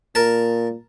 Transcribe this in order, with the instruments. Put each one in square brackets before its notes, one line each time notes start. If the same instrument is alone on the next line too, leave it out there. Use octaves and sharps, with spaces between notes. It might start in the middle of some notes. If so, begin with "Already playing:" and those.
[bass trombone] A#2 [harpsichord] A#4 A5